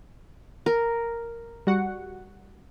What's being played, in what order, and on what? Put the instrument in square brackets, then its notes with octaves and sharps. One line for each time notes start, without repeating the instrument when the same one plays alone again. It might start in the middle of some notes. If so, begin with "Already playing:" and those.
[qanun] A#4
[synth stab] G3 F#4 F#5